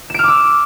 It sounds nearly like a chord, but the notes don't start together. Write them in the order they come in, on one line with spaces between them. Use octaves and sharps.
E7 D7 F6 D6 E6